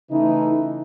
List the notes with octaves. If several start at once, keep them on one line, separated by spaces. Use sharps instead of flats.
C#3 E3 A3 D#4